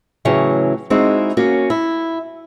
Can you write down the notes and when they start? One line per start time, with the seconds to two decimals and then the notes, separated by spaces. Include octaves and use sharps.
0.25 A2 C#3 E3 F#3
0.90 G#3 C4 D#4 E4 F#4
1.37 A#3 C#4 F#4
1.70 E4